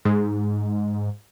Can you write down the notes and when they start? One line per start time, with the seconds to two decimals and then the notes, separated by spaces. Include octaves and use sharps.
0.05 G#2